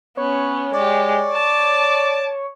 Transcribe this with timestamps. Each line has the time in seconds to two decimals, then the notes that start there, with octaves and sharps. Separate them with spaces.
0.17 B3 C#4 C#5
0.74 G#3 G4 D5
1.33 A5 D6